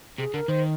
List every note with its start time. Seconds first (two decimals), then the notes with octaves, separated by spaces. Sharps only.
0.18 C3 G#4
0.34 D3 A#4
0.48 D#3 C5